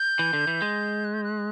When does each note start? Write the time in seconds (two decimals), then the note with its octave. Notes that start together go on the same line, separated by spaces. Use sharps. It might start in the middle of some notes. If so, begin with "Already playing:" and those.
Already playing: G6
0.19 E3
0.33 D3
0.47 E3
0.62 G#3
1.04 F#6
1.14 G6
1.24 F#6